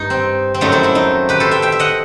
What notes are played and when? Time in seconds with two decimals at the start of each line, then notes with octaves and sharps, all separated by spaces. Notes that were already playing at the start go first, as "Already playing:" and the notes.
Already playing: G2 D#4
0.10 C4
0.54 C4
0.61 F#2 F#3 A3 D#4
0.72 C4 E4
0.83 C4 E4
0.95 D#4
1.29 G4 B4
1.40 A4 C5
1.51 E5 G5
1.62 E5 G5
1.72 E5
1.79 D#5 F#5